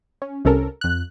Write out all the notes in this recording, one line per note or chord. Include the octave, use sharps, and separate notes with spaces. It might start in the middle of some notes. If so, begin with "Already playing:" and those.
C#4
C2 C3 C#4 A4 A#4
F2 F#6